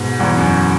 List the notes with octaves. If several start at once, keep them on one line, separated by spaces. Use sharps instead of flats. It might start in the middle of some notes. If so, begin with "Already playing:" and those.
Already playing: G#2 B2
E2 G#2
F#2